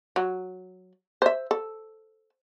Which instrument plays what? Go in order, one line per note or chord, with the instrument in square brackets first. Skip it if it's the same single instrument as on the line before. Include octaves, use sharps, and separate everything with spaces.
[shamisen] F#3
C5 E5
A4